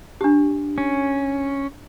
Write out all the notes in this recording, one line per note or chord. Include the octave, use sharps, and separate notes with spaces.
D4 G4
C#4